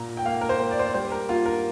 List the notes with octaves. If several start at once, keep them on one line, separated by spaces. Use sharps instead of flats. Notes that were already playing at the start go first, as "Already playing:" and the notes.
Already playing: A#2 A#3 A#5
G5
A#3 F5
A#4
C5
A#3
D5
C5
D5
G3 C5
A#4
A#3 F4
A#4